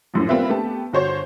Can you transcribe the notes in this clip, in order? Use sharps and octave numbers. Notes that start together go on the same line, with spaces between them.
A#1 F#2 A2
G3 A#3 C4 F4 B4 E5
A3 B3 G4 A5
G1 F#4 C5 C#5